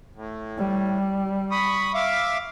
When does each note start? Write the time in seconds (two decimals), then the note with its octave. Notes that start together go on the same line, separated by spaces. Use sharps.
0.15 A2
0.58 G3
1.51 B5 C#6 D#6
1.94 E5 F5 D6